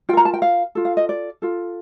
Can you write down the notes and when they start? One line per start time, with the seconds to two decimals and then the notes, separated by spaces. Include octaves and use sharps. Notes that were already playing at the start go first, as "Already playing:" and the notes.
0.09 F4 G5
0.13 A#4 A#5
0.25 A5
0.34 G5
0.42 F5
0.75 F4 A4
0.85 F5
0.97 D#5
1.09 D5
1.42 F4 A4